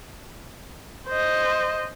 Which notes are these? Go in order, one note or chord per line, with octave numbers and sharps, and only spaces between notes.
C5 D#5